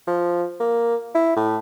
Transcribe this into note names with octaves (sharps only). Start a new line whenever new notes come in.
F3
A#3
E4
A2